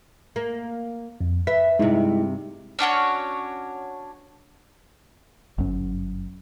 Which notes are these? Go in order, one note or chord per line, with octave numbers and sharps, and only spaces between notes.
A#3
F2
B4 E5 B6
G2 C3 G#3 D#4 E4
C#4 D4 F#4 C#5
G1 F#2 F#3 C#4